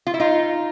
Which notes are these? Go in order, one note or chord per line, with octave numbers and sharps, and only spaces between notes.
F4
E4
D#4 F4